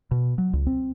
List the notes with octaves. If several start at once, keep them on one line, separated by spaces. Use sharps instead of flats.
B2
F#3
C#2
C4